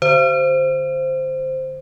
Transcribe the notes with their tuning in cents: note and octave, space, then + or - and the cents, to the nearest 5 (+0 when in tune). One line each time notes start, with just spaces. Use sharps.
D3 +10 C5 +0